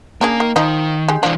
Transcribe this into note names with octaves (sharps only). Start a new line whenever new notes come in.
C#3 A#3 D4 G#4
D#3
D#3 F3 D#4 D#5
G#3 G4
E3 F3 D4